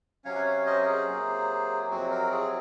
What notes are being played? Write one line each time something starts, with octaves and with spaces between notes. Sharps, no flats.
C3 F#3 C#4 C#5 F5
F#5
C#5 F5
C5 D#5
A#4
G#4 C5
C3 F#3 A#3
F2 C3 F#3 C4 F#4
F#4 A#4
F4 G#4